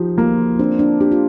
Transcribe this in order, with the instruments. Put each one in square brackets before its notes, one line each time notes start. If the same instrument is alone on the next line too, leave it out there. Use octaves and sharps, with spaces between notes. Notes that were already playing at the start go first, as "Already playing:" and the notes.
Already playing: [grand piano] F3 D#4 G4
[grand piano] A#3 [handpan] F4
[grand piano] C4 [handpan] D4
[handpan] D4
[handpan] D4 [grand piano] G4
[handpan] F4